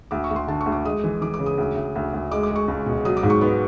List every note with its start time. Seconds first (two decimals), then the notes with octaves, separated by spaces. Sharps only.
0.11 D2 D6
0.24 C#6
0.30 D2
0.36 C6
0.48 D3 A5
0.61 C#6
0.66 D2
0.72 D6
0.85 G#3 D#6
1.04 E3
1.22 E3 D6
1.34 D6
1.39 C#3
1.46 D#6
1.58 D2
1.76 D2
1.96 D2
2.13 D2
2.31 G#3 D6
2.43 D6
2.51 G#3 C#6
2.68 C#2
2.86 B2
3.05 F#3 D#6
3.17 D6
3.23 G#2
3.30 C#6
3.41 B3